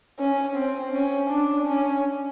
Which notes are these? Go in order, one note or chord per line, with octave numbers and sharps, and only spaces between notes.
C#4
C4
C#4
D4
C#4